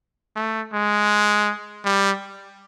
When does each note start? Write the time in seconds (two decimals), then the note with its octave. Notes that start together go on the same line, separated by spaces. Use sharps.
0.36 A3
0.73 G#3
1.85 G3